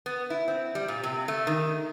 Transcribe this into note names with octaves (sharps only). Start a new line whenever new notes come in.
B3
E4
C4
G3
A#2
C3
A3
D#3